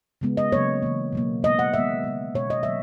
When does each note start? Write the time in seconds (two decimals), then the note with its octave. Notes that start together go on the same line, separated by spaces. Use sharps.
0.21 C#3 G#3 B3
0.37 D#5
0.52 C#3 F#3 A#3 C#5
0.82 C#3 E3 A#3
1.13 B2 F#3 A#3
1.43 B2 G#3 B3 D#5
1.59 F#5
1.74 D#3 G#3 B3 E5
2.04 C#3 G#3 B3
2.35 B2 G#3 B3 C#5
2.50 D#5
2.63 D#3 F#3 A#3 E5